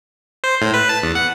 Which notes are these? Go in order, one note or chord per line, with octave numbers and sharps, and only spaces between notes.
C5
A2
B4
A5
E2
F#5